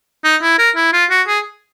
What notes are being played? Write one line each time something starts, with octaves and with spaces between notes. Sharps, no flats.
D#4
E4
A#4
E4
F4
F#4
G#4